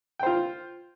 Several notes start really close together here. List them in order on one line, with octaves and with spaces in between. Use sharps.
G5 C5 F4